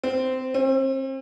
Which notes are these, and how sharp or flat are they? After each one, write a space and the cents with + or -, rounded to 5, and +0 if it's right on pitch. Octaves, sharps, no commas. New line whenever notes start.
C4 -15
C4 +35